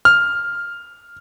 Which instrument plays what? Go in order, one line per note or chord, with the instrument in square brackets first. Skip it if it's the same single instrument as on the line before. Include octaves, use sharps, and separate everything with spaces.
[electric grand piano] F6